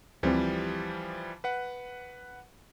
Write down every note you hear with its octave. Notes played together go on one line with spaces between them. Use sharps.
D2 E3 F3 G3 C4 G4
B4 F#5